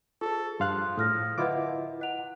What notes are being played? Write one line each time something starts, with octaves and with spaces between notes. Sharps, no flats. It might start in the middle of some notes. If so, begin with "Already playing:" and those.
F4 G#4 A4
G2 F3 F5 C6 F#6
A2 D#6 F6 A#6
D3 E4 F4 B4 D#5 E5 F#5 D6
D#5 F#5 F#6 F7